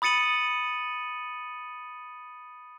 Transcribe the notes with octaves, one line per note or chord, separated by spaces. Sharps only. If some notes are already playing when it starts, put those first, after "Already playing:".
B5 D#6 A6 C#7 D#7 F#7